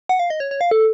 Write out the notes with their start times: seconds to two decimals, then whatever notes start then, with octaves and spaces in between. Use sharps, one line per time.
0.09 F#5
0.19 F5
0.30 D#5
0.40 C#5
0.51 C#5
0.61 F5
0.71 A4